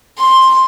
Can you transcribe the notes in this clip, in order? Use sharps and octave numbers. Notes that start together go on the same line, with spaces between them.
C6